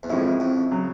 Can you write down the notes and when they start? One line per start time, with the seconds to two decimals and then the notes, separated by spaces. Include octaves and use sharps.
0.03 E2
0.10 F2 A2 F3 G#3 C#4 E4
0.40 F2
0.71 C#3 F#3